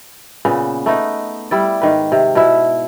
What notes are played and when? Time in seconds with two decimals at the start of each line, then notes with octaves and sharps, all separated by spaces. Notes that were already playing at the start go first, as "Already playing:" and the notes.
0.45 A#2 C#3 B3
0.86 A3 B3 D#4
1.51 G3 E4 D5
1.81 G#2 D#3 B4
2.12 C3
2.35 B2 E4